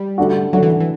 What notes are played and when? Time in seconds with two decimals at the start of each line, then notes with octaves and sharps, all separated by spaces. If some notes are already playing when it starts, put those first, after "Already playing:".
Already playing: G3
0.18 D3 A3 D4 F#4
0.53 D3 F#3 A3 D4 F#4
0.63 E3
0.80 E3